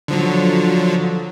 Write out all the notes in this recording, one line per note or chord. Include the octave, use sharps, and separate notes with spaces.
D3 F3 F#3